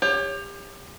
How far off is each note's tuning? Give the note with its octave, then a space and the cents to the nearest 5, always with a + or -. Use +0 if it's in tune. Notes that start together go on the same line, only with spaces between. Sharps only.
G4 +30 C#5 +0